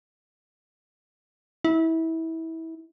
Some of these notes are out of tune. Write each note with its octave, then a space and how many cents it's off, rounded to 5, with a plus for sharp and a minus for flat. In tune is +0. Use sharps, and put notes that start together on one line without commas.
E4 -25